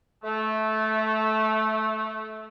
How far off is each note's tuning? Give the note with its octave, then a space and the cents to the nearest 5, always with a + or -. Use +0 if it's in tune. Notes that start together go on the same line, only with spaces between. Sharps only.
A3 -15